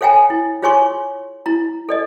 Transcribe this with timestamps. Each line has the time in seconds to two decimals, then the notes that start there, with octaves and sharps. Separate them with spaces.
0.01 A4 C#5 F5 G5 G#5 A#5
0.30 E4
0.62 F4 G#4 C#5 G#5 C6 C#6
1.46 E4 A#5
1.89 A4 D5 D#5